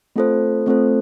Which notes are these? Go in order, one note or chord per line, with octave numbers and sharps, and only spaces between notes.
A3 C4 F4 A4 C5
A3 C4 F4 A4 C5